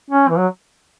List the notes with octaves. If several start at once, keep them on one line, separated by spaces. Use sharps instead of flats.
C#4
E3
F#3